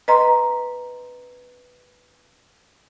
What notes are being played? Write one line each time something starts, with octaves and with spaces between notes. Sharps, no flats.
B4 D#5 A#5 C6